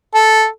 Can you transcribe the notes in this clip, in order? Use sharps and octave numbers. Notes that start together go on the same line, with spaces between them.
A4